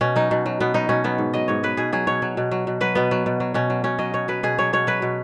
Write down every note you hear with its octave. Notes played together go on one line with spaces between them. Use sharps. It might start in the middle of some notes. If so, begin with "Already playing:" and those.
B2 C#4
F#3 D#4
B2
F#3
B2 B3
F#3 D#4
B2 C#4
F#3 B3
G#2
F#3 D#5
G#2 C#5
F#3 B4
B2 G#4
F#3 G#4
B2 C#5
F#3
B2
F#3
B2
F#3 B4
B2 B3
F#3
B2
F#3
B2 C#4
F#3
B2 C#4
F#3 D#5
B2 C#5
F#3 B4
B2 G#4
F#3 C#5
B2 C#5
F#3 B4
B2